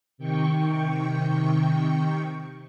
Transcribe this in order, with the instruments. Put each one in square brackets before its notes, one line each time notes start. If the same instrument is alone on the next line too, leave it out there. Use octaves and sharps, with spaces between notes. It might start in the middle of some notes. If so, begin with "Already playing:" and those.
[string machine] C3 D#3 G5 C#6